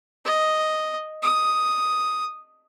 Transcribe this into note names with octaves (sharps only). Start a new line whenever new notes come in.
D#5
D#6